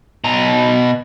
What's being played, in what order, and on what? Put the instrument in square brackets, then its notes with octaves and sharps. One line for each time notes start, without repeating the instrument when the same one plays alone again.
[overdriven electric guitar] B2 A#5